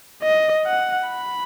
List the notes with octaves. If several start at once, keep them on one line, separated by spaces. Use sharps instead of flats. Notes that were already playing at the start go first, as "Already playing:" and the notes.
D#5
F#5
B5